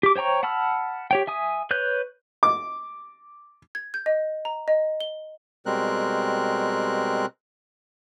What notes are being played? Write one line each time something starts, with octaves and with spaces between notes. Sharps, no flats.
G4 D6
C5 C#5 G5 A#5 C#6
F#5 A5 B5 E6 F6
G4 C#5 G5
E5 G#5 D#6
B4 C#5 F#6 G6
D6
G#6
G6
D#5
A#5
D#5
G7
B2 G3 G#3 C4 A#4 F#6